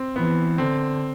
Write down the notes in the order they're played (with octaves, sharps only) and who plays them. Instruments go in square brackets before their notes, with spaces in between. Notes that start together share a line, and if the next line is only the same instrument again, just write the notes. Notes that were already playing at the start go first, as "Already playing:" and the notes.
Already playing: [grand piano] C4
[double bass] E3 [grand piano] B3
[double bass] D3 [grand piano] C4